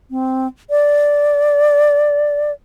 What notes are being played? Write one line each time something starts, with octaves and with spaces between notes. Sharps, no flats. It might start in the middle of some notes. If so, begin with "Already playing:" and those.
C4
D5